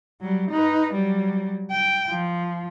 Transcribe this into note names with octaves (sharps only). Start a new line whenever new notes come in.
F#3 G3
D#4 B4
F#3 G3
G5
F3